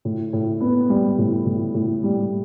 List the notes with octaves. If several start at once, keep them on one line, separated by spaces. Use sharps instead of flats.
A2
A2
B3
G3
A2
A2
A2
G3